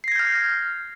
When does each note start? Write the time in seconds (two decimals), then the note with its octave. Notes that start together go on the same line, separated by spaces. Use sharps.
0.04 C7
0.08 A#6
0.12 G#6
0.16 G6
0.19 F6